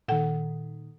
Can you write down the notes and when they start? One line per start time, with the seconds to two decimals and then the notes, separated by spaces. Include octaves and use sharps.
0.08 A#2 D#3 A4 F#5 G5